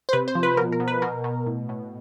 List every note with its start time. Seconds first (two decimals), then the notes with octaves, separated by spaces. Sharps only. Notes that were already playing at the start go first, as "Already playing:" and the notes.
0.09 C5
0.13 C3 B4
0.28 C5
0.35 F3
0.43 B4
0.57 B2 A#4
0.72 A#4
0.80 B2
0.88 B4
1.02 B2 A#4
1.24 B2
1.46 A2
1.69 A2